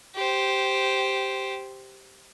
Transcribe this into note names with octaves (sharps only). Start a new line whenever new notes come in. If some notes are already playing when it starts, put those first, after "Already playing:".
G4 C5